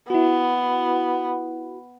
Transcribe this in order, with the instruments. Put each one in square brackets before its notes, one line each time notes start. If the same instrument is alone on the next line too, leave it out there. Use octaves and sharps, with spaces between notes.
[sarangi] B3 [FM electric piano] E4 F#4